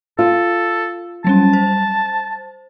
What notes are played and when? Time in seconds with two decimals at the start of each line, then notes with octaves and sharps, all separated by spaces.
0.19 F4 A4
1.24 F#3 G3 C#4 A5
1.53 C5